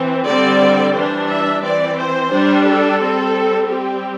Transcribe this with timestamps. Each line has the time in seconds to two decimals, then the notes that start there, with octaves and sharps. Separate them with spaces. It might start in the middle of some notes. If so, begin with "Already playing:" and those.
Already playing: E3 C4
0.27 D3 G3 C4 D5
0.95 E3 G3 D4 C5
1.30 E5
1.63 E3 C4 D5
1.98 C5
2.32 G3 D4
2.66 A4
3.01 G3 C4
3.69 G3 C4 G4